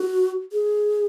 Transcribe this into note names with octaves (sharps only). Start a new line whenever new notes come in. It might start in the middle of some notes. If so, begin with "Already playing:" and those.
Already playing: F#4
G#4